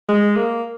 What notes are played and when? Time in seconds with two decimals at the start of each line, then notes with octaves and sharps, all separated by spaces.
0.09 G#3
0.37 A#3